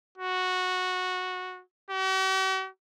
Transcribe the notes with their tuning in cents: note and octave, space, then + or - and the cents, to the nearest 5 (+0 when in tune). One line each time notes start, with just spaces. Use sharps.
F#4 -10
F#4 +45